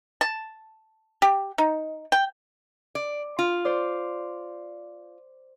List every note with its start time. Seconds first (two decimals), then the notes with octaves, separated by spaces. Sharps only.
0.21 A5
1.22 G4
1.58 D#4
2.12 G5
2.95 D5
3.39 F4
3.65 C5 D5